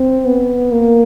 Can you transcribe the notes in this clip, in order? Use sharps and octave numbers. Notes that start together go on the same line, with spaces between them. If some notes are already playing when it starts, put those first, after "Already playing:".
Already playing: C4
B3
A#3